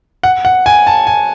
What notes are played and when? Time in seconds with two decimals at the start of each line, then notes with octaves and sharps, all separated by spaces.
0.23 F#5
0.45 F#5
0.66 G#5
0.87 A5
1.07 G#5